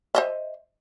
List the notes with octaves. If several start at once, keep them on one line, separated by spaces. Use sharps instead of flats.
C5 D#5 E5